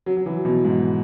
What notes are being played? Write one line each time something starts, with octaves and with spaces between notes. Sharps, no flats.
F#3
F#3
E3
B2
G#2